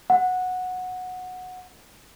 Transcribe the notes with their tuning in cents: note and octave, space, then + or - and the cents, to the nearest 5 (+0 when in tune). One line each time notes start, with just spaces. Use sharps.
F#5 -10